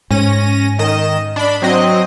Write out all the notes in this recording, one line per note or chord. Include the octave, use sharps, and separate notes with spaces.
G#2 C#4 A#6 D#7
D#3 D#5 E7
D4 B5
F#3 C4 D#5